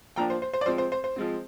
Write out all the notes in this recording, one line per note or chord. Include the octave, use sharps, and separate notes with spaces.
F3 A#3 D4 G5 A#5
C5
C5
C5
D5
F3 G#3 C4 C5
C5
C5
C5
F3 G#3 C4